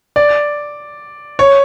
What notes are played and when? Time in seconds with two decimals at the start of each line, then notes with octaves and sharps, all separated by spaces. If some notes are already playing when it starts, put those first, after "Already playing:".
0.16 D5
1.39 C#5